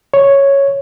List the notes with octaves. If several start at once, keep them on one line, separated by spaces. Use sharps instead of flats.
C#5